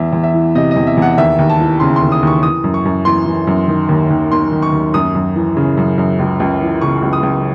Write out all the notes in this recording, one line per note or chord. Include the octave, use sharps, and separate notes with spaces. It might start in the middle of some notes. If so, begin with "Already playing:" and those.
Already playing: E2 E5
E2
E5
E3
C3 D#5
D#5
E2
E5
E2 F#5
D#2 E5
D#2
A5
E3
C#3 C6
C6
D#2
D#6
D#2 C#6
E3 D#6
F#2
C#6
F#2
E3 C6
E3
F#2
D#3
D#2
D#2
D#3 C6
D#3
C#6
D#2
F#2 D#6
F#2
E3
C#3
F#2
F#2
C#2
C#2
E3
C#3 C#6
C#2
D#6
C#2